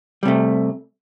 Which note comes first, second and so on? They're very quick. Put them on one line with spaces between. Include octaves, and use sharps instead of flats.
G3 C3 A3